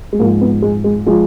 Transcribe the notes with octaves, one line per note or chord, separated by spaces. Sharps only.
G#3
G#2 F3 A#3
B3
G#3
G#3
F3 G#3